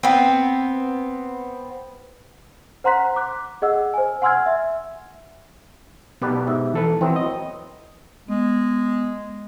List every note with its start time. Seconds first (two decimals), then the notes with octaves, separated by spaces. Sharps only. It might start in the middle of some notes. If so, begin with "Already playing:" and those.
0.03 B3 C4
2.84 C5 F#5 A#5 C6 F#6 B6
3.16 D6 F#6
3.62 G#4 D#5 F#5 E6
3.94 C5 G#5
4.22 F#5 G#5 C6 E6 F6 G#6
4.46 E5
6.22 B1 B2 B3 G4 B4 D5
6.47 G#2 E5
6.74 E3 A4 B4
7.01 E3 F#3 B3 C4
7.16 D#5
8.28 G#3 B3